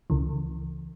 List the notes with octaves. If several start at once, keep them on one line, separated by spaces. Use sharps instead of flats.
C#2 C#3 E3